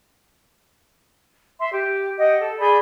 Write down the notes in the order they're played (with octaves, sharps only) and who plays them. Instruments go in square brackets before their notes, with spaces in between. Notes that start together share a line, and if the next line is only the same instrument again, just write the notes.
[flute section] E5 C6
G4
G4 D#5 F#5
A4
G#4 D5 B5 G6